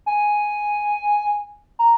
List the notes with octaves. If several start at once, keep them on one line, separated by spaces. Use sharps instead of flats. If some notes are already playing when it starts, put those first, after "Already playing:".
G#5
A#5